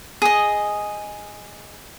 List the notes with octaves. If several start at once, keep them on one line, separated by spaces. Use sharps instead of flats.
G#4 D#5